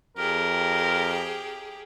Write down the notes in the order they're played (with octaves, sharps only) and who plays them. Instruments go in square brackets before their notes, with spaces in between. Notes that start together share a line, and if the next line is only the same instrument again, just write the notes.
[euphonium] F2 [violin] G4 G#4 [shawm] A#4